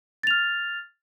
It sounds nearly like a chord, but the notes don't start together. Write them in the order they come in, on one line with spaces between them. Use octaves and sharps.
A6 F7 F6